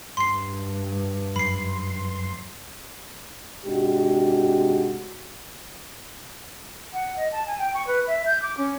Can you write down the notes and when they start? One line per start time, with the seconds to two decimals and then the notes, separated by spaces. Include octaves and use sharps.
0.17 G2 C6 C7
1.36 F#2 B5 C6 C7
3.63 G#2 C3 G#3 D4 F#4 G4
6.94 F#5
7.17 D#5
7.32 A5
7.47 G#5
7.59 G5
7.74 C#6
7.87 B4
8.07 E5
8.26 G6
8.42 D6
8.58 C#4